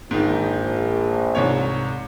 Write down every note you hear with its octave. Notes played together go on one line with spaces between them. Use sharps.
A#1 G#2 D#3
C2 G#2 C#5